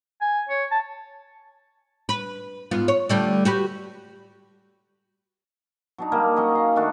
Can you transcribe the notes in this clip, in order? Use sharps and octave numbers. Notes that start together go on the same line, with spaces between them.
G#5
C#5
A5
B4
G#2 B3 F4
C#5
D3 G3 A3
F#4 G4 B4
F#3 D4 D#4
G3 A#3
F#3 C#4 D#5
D#5 F5
D#3 A3 D4 F#4